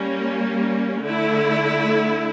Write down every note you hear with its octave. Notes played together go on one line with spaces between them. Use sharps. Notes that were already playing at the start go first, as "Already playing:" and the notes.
Already playing: G3 A#3 C#4
D3 A3 E4